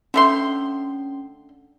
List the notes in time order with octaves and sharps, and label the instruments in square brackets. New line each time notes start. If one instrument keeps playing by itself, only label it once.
[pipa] D3 A3 C6 [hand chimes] C#4